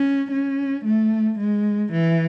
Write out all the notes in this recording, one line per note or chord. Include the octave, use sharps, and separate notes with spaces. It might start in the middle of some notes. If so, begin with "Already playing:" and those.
Already playing: C#4
C#4
A3
G#3
E3